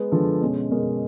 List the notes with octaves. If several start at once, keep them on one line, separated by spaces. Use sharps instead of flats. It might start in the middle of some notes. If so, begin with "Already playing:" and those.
Already playing: G#3 B3
D3 F3 G#3 B3 A4
B2 G#3 C#4
B2 G#3 C#4 A#4